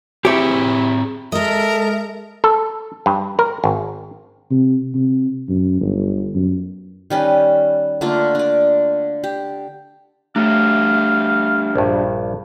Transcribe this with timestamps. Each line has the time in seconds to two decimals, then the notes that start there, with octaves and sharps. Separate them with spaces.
0.25 C4 E4 G4 G#4 C#5 E5
1.32 G#3 A4 A#4 D#5 E5
2.44 A4
3.06 G2
3.39 A#4
3.64 G#1
4.51 C3
4.95 C3
5.49 F#2
5.81 G1
6.35 F#2
7.10 D#3 G3 C#4 B4
8.01 D3 A3 A#3 F4
8.35 D4 D5
9.24 G4
10.36 A3 D4 G4 E5 F5
11.76 A#1 G2